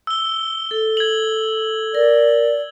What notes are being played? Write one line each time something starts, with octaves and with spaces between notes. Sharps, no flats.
E6 G7
A4
G#6 F#7
A#4 D5